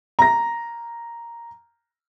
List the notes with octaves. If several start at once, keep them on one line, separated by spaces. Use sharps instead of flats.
A#5 A#6